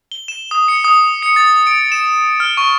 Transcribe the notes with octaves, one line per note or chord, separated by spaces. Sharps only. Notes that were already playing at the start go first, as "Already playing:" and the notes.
G7
E7
D#6
C#7
D#6
C#7
A6
D7
E7
F6
C#6